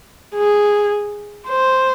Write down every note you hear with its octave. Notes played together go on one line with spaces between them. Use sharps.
G#4
C5